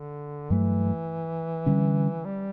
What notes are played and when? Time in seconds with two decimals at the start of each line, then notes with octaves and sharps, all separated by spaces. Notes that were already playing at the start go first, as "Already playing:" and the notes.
Already playing: D3
0.50 G2 E3 F#3 A3
1.66 D3 G3 C#4
2.25 G3